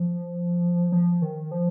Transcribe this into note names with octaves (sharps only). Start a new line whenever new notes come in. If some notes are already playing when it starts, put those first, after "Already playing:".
Already playing: F3
F3
D#3
F3